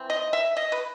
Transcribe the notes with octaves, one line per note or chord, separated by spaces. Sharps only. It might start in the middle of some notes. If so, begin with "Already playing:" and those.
Already playing: E3 C4
D#5
E5
D#5
B4